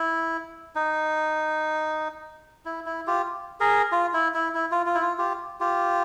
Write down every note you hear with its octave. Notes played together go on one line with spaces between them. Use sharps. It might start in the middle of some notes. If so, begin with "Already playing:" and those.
Already playing: E4
D#4
E4
E4
F4 G4
G#4 A#4
F4
E4
E4
E4
F4
F4
E4
F4
F4 G4
F4 G4